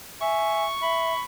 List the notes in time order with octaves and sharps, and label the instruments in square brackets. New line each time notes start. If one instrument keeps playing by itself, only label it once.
[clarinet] E5 [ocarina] G#5 [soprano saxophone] C#6
[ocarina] E5 [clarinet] B5